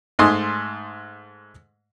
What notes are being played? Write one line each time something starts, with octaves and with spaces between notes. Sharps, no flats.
G#2 A3 D#5 G#5 C6 D#6